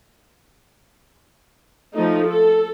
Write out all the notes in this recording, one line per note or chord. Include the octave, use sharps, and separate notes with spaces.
F3 A3 D#4
A4